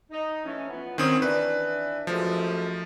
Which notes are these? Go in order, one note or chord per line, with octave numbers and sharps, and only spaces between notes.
D#4
E3 A3 C#4
F3 B3
D#3 C4 C#4 D#6
E3 D4 B4
F#2 F3 G#3 A3